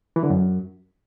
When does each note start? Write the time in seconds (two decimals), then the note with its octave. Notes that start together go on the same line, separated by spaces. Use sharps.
0.16 E3
0.23 D3
0.30 F#2